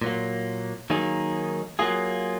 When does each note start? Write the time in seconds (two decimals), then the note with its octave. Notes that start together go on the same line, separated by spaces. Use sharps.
0.02 A#2 F#3 A#3
0.90 D#3 F#3 A#3 D#4 G#4
1.79 F#3 A#3 F4 G#4